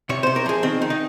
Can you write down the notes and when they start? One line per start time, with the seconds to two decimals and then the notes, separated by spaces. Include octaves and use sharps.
0.09 C3 C#5
0.23 C3 C5
0.36 A#4
0.46 F3 G#4
0.63 D#3 C4
0.82 D#3
0.90 D#4